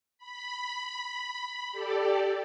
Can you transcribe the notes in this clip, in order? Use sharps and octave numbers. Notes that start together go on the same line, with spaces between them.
B5
G4 A4 D5